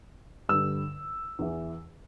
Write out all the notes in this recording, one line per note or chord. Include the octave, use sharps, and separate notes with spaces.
G2 D3 E6
E2 E3